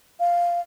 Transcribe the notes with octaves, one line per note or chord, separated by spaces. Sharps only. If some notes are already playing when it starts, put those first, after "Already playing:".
F5